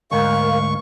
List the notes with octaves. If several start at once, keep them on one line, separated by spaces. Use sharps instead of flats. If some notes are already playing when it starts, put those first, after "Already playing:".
D2 G#2 A#4 F5 C#6